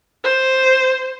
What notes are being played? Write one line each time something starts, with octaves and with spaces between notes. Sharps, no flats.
C5